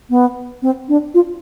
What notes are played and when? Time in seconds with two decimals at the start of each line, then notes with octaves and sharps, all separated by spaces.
0.10 B3
0.62 C4
0.89 D4
1.14 F4